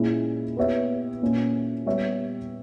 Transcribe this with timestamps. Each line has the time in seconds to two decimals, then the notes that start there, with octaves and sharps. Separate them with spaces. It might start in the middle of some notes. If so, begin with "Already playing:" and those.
Already playing: A#2 G#3 C#4 E4
0.57 B3 G4 C#5 E5
1.22 A#2 A#3 C#4
1.86 G3 B3 G4 C#5 E5